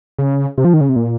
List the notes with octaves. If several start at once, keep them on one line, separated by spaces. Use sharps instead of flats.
C#3
C3
F3
D#3
C#3
C3
A#2